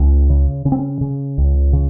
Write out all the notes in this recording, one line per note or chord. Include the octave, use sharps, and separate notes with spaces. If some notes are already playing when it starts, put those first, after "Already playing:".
Already playing: C#2 C#4
C#3
C#3 C#4
C4
C#4
C#3
C#2
C#3